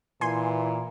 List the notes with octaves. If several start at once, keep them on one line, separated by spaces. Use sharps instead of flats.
A#2 E3 G#5 C6